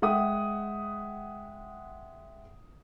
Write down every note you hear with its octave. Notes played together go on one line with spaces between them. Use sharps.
G#3 E5 F#5 G5 D#6